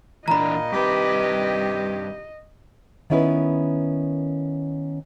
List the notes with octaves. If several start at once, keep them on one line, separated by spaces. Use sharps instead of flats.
A#2 E3 D4 D#5 A#5 B5
G2 C3 D#3 G4 B4
D#3 B3 C#4 E4 A#4 B4